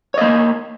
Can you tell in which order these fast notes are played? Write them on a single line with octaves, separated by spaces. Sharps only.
C#5 D#5 A#3